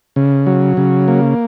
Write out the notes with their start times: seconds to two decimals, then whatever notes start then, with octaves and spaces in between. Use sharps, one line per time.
0.16 C#3
0.47 F#3
0.77 C#3
1.08 A#3